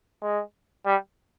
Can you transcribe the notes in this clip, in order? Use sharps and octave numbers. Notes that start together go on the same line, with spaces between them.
G#3
G3